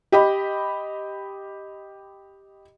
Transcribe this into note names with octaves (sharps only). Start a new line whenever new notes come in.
G4 D#5 B5